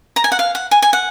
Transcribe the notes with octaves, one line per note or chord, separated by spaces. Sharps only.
A#5
G#5
F#5
F5
F#5
G#5
G#5
F#5